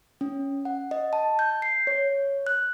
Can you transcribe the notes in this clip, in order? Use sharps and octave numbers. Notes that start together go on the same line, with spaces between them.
C#4
F#5
D#5
A5
G6
C7
C#5
F#6